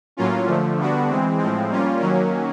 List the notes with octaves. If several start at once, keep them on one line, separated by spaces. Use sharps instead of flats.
A2 F#3 A#3 C#4 F4
D3 F3 A3
D3 G3 B3 D4 F#4
E3 G#3 C4
A2 F3 G#3 C4
G3 A#3 C#4 F4
D#3 F#3 A#3 C#4